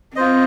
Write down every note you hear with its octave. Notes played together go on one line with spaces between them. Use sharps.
C4 F4 C5 D#5